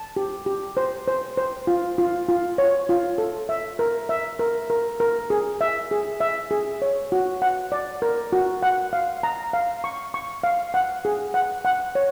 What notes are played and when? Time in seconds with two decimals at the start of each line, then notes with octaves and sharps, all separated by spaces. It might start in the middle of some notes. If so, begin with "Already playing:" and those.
Already playing: A5
0.16 G4
0.46 G4
0.77 C5
1.08 C5
1.38 C5
1.67 F4
1.98 F4
2.29 F4
2.58 C#5
2.89 F4
3.18 A4
3.49 E5
3.79 A#4
4.09 E5
4.39 A#4
4.70 A#4
5.00 A#4
5.30 G#4
5.61 E5
5.91 G#4
6.20 E5
6.51 G#4
6.82 C#5
7.12 F#4
7.42 F#5
7.72 D5
8.02 A#4
8.33 F#4
8.63 F#5
8.93 F5
9.23 A#5
9.53 F5
9.84 C#6
10.14 C#6
10.44 F5
10.74 F#5
11.05 G#4
11.34 F#5
11.65 F#5
11.95 C#5